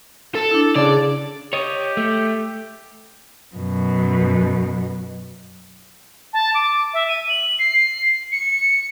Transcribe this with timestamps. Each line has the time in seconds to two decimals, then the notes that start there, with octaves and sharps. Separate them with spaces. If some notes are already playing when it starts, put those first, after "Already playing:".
0.35 A4
0.51 D4 E4
0.76 C#3 D4 G#4 D5
1.53 G4 C#5 D#5
1.97 A3
3.55 F#2 B2
6.33 A5
6.55 D6
6.94 E5
7.09 D#7
7.29 F#7
7.59 C7
8.32 C#7